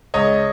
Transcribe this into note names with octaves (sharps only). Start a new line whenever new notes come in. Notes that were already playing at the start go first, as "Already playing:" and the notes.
C#2 C#5 D#5